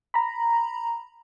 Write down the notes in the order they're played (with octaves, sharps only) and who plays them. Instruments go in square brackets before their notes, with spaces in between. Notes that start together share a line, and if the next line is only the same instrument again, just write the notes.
[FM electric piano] A#5 B5